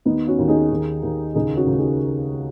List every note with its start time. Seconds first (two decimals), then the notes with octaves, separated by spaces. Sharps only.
0.05 D#2 B3 D#4
0.27 C#4 F#4
0.39 D#2
0.49 D#4 G#4
0.71 D#2
1.03 D#2
1.35 C#2 D#4 G#4
1.56 C#4 F#4
1.67 C#2
1.72 F#4
1.78 D#4 G#4